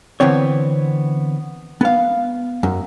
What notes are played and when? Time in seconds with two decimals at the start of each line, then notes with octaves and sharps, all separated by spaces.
0.20 D3 E3 B3 C4 C#5
1.81 B3 F5
2.63 F#2